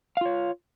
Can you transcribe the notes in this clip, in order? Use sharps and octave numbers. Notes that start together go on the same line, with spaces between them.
F4 C#5 F5